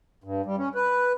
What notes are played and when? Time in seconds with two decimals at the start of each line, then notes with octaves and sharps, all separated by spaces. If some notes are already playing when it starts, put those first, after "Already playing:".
0.24 G2
0.46 G3
0.58 C#4
0.75 B4